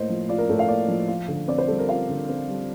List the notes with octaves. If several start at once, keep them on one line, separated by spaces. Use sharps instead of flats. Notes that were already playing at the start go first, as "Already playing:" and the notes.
Already playing: A2 A#3 C5 D#5
F3
F4 D5
A#4
A2 A4
F5
A#3 D5
F3
F4
D3
C4 D5
C5
G3 A4
A#4
F4 F5
D3
C4
G3